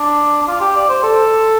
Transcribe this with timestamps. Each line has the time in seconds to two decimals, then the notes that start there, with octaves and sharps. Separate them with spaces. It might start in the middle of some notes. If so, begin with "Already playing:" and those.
Already playing: D4
0.42 D4
0.47 F4
0.61 G4
0.76 D5
0.89 C5
1.03 A4